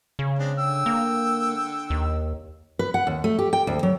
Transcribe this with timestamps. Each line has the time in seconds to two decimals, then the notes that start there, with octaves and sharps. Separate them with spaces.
0.19 C#3
0.39 G#3 C4 D4
0.58 D3 G5 E6
0.86 A#3
1.90 D#2
2.79 B4
2.94 F#5
3.07 D#2
3.24 A3
3.39 G4
3.53 G5
3.67 D2
3.83 F#3